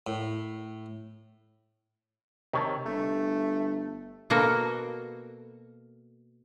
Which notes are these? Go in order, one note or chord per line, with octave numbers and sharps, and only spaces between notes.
A2
C3 D#3 C#5 A5
G1 A3
B2 A#3 F#4 A4